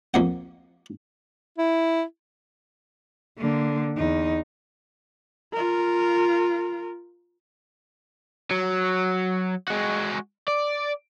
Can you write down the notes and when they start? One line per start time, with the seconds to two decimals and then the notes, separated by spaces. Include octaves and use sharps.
0.14 F2 A#3 F#5
1.58 E4
3.38 D3 A#3
3.97 E2 D#4
5.52 F4 A#4
8.51 F#3
9.68 G#3 F#4
10.48 D5